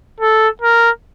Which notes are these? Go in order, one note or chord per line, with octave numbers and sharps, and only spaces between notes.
A4
A#4